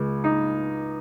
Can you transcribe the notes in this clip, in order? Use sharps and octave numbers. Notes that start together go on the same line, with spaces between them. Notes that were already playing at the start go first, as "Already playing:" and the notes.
Already playing: C#2 G#3
D#4